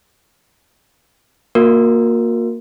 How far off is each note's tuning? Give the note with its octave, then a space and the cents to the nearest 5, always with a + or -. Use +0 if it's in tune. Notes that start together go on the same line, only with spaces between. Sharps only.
A#3 +0 F#4 -40 A#4 +0